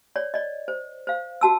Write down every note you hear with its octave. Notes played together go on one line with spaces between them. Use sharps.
C#5 D5
D5 D#5
C5
C5 F5
F#4 A5 E6